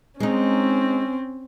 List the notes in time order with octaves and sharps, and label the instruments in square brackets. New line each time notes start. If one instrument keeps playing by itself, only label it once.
[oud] G#3 D#4 [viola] C4 C#4